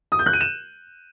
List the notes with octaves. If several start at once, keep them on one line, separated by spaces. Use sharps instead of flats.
D#6
G6
F#6
D#7
E7